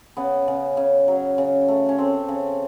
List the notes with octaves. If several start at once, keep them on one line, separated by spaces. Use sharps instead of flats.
C#3 B3
C#3
C#3
F#3
C#3
A3
C#4
A3 C4
C#3